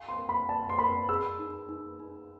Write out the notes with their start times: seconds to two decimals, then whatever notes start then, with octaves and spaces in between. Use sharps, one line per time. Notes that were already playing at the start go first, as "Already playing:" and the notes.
Already playing: F5 G#5
0.09 C6
0.19 A#4
0.29 B5
0.49 D5 A5
0.69 C6
0.79 A#4 B5
1.09 G#4 E6
1.39 D#4
1.69 D#4
2.00 D#4